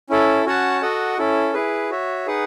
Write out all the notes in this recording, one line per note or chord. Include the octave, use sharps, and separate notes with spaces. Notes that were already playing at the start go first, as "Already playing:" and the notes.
C#4 E4 A4
C#4 F#4 C#5 F#5 A5
F#4 A4 D#5 F#5
C#4 E4 A4
E4 G#4 B4
F#4 C#5 E5
D#4 G#4 B4 F#5